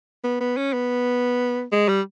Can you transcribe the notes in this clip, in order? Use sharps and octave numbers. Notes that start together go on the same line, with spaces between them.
B3
B3
C#4
B3
G#3
G3